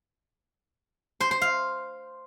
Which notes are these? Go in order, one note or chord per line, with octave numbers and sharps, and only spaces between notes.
C5
C5
F5